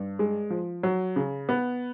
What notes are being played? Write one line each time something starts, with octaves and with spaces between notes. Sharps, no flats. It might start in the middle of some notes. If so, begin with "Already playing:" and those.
Already playing: G2
G#3
F3
F#3
C#3
B3